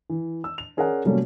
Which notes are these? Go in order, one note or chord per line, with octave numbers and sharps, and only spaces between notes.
E3
E6
F7
C#4 G#4 A#4 C#5 D5 F#5
C3 F#3 G3 A3 A#3 C#4